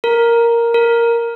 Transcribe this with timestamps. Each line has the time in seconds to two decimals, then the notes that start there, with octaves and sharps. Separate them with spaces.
0.04 A#4
0.74 A#4